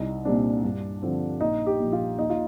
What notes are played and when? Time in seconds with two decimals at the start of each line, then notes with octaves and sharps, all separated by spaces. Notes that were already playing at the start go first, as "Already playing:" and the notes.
Already playing: C2 D#4
0.25 A#2 G3 C4 D4
0.64 G2
1.02 D3 F3 C4
1.41 A#1 D#4
1.66 G4
1.80 A#2 F3
1.93 F4
2.18 D#2 D#4
2.30 F4